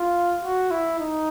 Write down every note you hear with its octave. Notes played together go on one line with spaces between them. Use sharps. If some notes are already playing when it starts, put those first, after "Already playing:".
Already playing: F4
F#4
E4
D#4